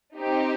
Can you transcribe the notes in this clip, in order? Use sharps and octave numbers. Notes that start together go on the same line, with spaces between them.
C4 D#4 G4